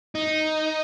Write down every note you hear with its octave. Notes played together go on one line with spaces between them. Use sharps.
D#4